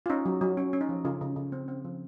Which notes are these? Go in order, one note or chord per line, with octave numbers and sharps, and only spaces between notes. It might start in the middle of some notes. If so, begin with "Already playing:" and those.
F4
C#4 D#4
F#3
F#3
C#4
C#4
D#4
F3
C#3 F4
C#3
C#3
C4
C4
F3